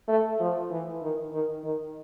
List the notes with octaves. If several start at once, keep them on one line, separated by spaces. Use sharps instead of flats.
A3
F3
E3
D#3
D#3
D#3